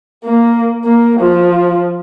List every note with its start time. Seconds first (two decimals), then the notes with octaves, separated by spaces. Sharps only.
0.25 A#3
0.85 A#3
1.20 F3